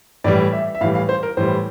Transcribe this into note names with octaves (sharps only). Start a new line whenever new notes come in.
A2 E3 G3 D5
E5
E5
A2 E3 G3 F5
F5
C5
A#4
A2 E3 G3 C5